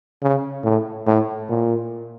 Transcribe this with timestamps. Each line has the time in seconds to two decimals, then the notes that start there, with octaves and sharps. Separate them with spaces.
0.22 C#3
0.64 A2
1.07 A2
1.49 A#2